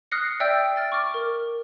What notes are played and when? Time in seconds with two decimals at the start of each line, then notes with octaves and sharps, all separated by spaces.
0.11 D#6 F6 F#6 A#6 C7 C#7
0.40 D5 E5 G5 E6 G6 D7
0.76 F6 A6 D7
0.92 C#6 D6 F6
1.14 A#4